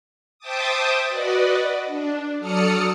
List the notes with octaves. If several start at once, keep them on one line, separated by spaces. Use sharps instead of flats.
C5 E5 G5 A5 D6 D#6
F#4 B4 D5 D#5
D4
F#3 A4 D5 D#6 F6 C#7